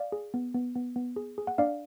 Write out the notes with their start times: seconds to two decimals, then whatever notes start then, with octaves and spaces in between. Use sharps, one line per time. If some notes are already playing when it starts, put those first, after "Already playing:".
Already playing: D5 F5
0.12 G#4
0.34 B3
0.54 B3
0.75 B3
0.96 B3
1.16 G#4
1.38 G#4
1.47 F#5
1.58 D4 D5 F5